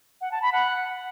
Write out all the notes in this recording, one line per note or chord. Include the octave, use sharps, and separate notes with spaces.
F#5
A5
B5
F#5